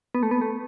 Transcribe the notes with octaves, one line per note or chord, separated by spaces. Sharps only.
B3
A3
B3
A3